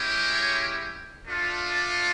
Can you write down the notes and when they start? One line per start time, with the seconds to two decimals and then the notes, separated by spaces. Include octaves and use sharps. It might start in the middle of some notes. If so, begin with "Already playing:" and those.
Already playing: G#3 C#4 E4 G4
0.33 C#5
1.25 A3 D4 F4
1.70 D5